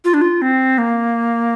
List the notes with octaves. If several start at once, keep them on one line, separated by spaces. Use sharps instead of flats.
F4
D4
F4
C4
A#3